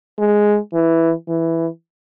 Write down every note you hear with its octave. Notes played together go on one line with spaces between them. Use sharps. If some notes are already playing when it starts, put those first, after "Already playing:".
G#3
E3
E3